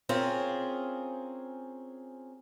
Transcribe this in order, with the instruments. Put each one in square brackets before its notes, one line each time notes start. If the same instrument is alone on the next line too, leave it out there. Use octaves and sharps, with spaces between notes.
[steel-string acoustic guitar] C4 C#4 F4 G#4 A#4